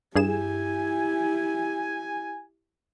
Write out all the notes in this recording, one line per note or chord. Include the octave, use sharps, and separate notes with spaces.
G2 E4 G4 G#4 G#5 E7